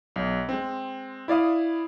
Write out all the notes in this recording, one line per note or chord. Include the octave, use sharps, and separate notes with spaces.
B1
G#3 C4
E4 D5 F5 D#6